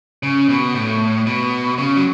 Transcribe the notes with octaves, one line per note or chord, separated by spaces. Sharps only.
C#3
B2
A2
B2
C#3
F#3